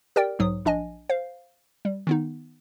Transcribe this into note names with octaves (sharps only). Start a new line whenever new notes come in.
G4 A#4 D5 G5
B1 G#2 F#3 D#6
A#1 D4 D#5 G#5
C5 F5
G3
D#3 B3 D#4